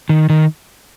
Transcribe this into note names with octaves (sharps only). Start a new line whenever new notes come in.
D#3
D#3